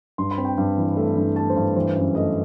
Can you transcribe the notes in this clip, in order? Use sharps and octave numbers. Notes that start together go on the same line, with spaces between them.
G2 C6
B5
C4
G5
G2
E3
A3
G2
A3 A5
C5
G2
E3 C5
F#2
A3 D#5